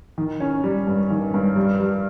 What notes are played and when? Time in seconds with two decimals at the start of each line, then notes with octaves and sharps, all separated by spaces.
0.18 D#3
0.40 C#4
0.64 G3
0.87 G2
1.10 D#3
1.34 G2
1.56 G3
1.80 G3